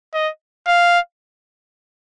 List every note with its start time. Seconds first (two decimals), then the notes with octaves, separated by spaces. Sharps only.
0.14 D#5
0.67 F5